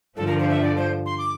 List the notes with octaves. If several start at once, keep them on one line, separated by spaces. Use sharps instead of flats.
G2 D3 F3 A4
A#4
C5
E5
D5
C5
C6
D6